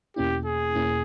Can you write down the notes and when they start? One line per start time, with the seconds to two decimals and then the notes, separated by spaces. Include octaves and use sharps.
0.16 E2 B2 A#3 C#4 E4 G4
0.46 G#4
0.75 E2 B2 A#3 C#4 E4